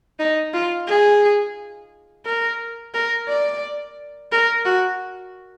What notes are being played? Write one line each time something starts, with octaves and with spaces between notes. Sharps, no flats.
D#4
F4
G#4
A#4
A#4
D5
A#4
F#4